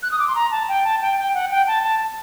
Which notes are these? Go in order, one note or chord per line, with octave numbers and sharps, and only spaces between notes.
F#6
D#6
D6
C6
A#5
A5
G5
A5
G5
G5
F#5
G5
A5
A5